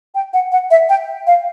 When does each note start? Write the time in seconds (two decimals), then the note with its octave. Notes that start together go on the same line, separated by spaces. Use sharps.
0.15 G5
0.33 F#5
0.52 F#5
0.71 E5
0.89 G5
1.27 F5